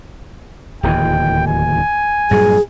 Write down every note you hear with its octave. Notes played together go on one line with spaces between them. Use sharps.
D1 D#2 E3 G5
G#5
G2 A#2 F#3 G#4